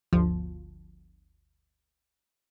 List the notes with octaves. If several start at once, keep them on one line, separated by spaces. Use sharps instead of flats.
G1 D2 F3